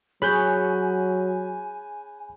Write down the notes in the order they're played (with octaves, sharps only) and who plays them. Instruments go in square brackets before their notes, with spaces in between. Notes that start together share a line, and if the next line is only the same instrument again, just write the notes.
[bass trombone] F#3 [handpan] G#4 C#5 [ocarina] G#5 [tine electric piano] B5 F#6 G6